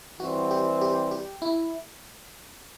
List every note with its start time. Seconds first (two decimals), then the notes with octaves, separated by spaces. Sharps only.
0.20 E3 G3 C4 F#4
0.51 G4
0.81 G4
1.11 G4
1.42 E4